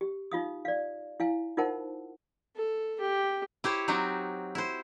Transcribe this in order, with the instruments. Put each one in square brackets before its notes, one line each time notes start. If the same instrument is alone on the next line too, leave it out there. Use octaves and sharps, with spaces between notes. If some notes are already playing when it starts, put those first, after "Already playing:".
[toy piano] G4
D#4 F4 F5 D#6
D5 F5
E4 F5 G#5
D#4 F4 A#4 C5 F#5 A5
[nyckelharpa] A4
G4
[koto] E4 G4 C5 C#5
F#3 C4 D#4 F#4 G4
E4 C5